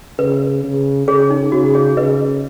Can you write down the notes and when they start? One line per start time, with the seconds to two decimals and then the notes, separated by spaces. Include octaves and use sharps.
0.19 C#3 B4
0.64 C#3
1.07 C#3 G#4 C#5
1.30 D#4
1.52 C#3 F#4
1.74 G#4 C#5
1.97 C#3 B4 D#5